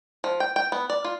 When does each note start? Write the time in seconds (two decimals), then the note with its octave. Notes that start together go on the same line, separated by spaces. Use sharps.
0.24 F3
0.40 G5
0.56 G5
0.72 B3
0.90 D5
1.04 F4